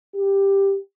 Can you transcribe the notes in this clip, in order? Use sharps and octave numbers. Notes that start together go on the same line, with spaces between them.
G4